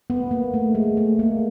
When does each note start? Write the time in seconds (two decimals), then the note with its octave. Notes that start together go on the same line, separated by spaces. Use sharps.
0.10 B3
0.31 A#3
0.54 A3
0.75 G#3
0.97 A3
1.19 A#3